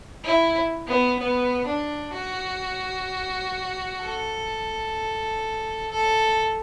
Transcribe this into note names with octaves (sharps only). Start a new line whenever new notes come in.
E4
B3
B3
D4
F#4
A4
A4